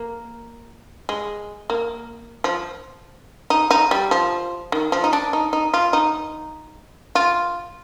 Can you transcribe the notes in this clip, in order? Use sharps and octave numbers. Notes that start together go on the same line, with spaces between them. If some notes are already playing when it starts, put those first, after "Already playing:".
Already playing: A#3
G#3
A#3
F3
D#4
D#4
G3
F3
D#3
F3
D#4
D4
D#4
D#4
F4
D#4
F4